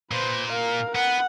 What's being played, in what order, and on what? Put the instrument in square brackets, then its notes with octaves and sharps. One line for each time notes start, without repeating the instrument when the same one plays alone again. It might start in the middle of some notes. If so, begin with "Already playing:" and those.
[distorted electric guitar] A#2 [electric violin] B4 C5
[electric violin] A#4 F5
[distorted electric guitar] B3 [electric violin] F#5